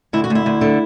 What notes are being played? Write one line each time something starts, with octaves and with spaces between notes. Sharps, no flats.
D2 E4
F#4
D2
E4
D2
D3